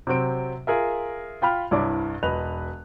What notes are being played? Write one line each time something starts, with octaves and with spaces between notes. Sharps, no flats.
C3 F#3 C4 D7
F4 G#4 A#4 E5
F4 G5 B5 F6
C2 G2 E4 C#5 D5 D6
E1 B4 D#5 F#6 F7